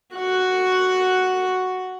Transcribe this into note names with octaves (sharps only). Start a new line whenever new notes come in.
F#4 F#5